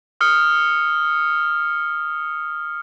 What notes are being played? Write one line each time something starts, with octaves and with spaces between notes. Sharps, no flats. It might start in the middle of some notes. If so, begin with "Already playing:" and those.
D#6 F6 C#7